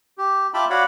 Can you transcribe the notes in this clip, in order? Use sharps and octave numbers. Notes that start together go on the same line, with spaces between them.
G4
F4 E5 G5 A5 B5 D6
F#4 C#5 D5 F5 F#5 B5